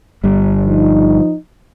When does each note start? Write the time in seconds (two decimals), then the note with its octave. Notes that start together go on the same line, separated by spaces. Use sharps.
0.24 G1 G3
0.65 F3 D#4